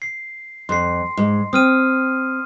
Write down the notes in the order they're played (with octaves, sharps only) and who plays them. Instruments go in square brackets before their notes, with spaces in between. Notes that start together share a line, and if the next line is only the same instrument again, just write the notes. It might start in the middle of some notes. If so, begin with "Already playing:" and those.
[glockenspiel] C7
[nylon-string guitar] F2 [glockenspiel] C6 C7
[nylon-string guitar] G#2
[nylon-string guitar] C4 [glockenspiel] D#6 F6 D#7